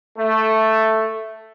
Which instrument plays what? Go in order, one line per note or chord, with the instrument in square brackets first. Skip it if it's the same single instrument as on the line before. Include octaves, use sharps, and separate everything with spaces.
[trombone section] A3